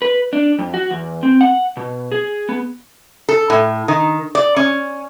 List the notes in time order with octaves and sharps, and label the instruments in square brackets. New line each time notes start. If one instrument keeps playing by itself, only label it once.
[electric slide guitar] B4
D4
F2
F#4
E2
C4
F#5
B2
G#4
B3
[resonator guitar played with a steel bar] A4
A2
D#3
D5
C#4